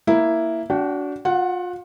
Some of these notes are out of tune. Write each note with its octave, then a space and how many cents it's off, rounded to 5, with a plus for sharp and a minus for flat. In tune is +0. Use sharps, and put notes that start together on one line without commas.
A#3 +0 E4 +0
D4 -30 F#4 +0 G5 -30
F4 +35 F#5 +0